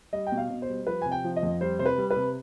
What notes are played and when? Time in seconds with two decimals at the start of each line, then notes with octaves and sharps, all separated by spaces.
0.13 G3 D#5
0.27 G5
0.32 B2
0.37 F5
0.50 B2
0.62 C5
0.69 G3
0.87 F3 B4
1.02 C3 G#5
1.12 G5
1.24 F3
1.36 D#5
1.43 F2
1.61 G3 C5
1.79 C3 C5
1.86 B4
1.98 G3
2.11 B4
2.16 C3